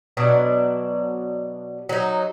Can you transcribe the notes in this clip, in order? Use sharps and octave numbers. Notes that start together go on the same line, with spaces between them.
B2 F#3 D4
F#3 D#4